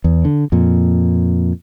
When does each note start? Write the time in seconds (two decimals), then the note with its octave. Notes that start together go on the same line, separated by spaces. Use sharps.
0.04 E2
0.25 D3
0.52 F2 A#2